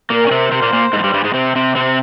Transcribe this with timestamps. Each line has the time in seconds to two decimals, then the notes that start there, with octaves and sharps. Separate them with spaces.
0.10 A#2 A#3 A#4
0.27 C#4
0.31 C3 C4
0.52 C3 C4 C5
0.62 A#2 A#3
0.73 A#2 A#3
0.93 G#2 G#3
0.98 F3
1.04 G2 G3
1.14 G2 G3
1.24 G#2 G#3
1.34 C3 C4
1.56 C3 C4
1.75 C3 C4